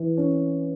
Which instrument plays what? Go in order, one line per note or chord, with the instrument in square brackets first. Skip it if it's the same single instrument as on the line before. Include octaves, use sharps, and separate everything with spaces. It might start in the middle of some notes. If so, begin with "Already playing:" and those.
Already playing: [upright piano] E3
C#4